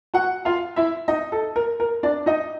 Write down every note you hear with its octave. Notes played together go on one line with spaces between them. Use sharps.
F#4 F#5
F4 F5
E4 E5
D#4 D#5
A4
A#4
A#4
D4 D5
D#4 D#5